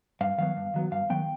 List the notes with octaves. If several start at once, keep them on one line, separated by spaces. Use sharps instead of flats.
G2 F5
D#3 F#3 B3 F5
G2
D#3 F#3 B3
G2 F5
D#3 F#3 B3 G5